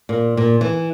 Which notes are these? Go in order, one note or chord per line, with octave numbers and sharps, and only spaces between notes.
A#2
A#2
E3